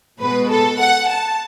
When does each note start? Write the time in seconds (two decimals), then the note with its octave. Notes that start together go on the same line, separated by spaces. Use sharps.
0.20 B2 G#3 B4
0.51 A4
0.79 F#5
1.09 A5